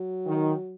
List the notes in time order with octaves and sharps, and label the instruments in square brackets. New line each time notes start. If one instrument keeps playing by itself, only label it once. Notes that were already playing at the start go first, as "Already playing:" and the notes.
Already playing: [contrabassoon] F#3
[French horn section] D#3